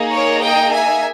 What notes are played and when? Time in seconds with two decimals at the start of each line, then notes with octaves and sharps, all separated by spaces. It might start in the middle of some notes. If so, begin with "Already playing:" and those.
Already playing: A#3 D#4 G#4
0.15 A#4 C#5
0.44 D#5 G5
0.73 E5 G#5